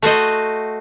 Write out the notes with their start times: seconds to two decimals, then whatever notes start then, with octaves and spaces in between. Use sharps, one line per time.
0.02 A3 F#4 C5 D#5